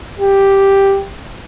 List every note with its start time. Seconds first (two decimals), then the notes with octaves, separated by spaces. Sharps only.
0.20 G4